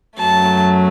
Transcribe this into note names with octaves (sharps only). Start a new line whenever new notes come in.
F#2 F#3 A3 A5